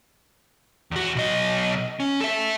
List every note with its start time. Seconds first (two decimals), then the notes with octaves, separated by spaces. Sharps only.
0.91 E2 F#4
1.16 B1 D#5
2.00 C#4
2.21 A4 E5